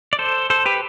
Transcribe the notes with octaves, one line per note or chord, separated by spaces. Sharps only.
D5
A4 C5
A4 C5
G4 B4